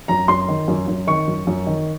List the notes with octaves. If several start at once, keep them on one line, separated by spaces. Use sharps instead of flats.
F#2 A#5
F#2 C6
D#3
F#2
F#2
D#3 C#6
F#2
F#2
D#3